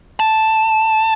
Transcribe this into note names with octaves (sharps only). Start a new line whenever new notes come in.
A5